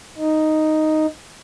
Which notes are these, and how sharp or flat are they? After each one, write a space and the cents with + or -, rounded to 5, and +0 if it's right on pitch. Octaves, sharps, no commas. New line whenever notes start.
D#4 +0